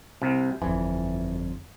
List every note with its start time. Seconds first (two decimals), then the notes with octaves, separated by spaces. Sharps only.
0.22 C2 C3
0.62 G1 F2 E3